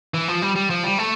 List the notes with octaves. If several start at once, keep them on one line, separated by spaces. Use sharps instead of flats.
E3
F3
G3
G3
F3
G3
A3